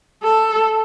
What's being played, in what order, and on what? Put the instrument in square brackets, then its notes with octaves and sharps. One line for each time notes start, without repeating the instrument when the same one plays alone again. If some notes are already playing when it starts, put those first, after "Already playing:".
[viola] A4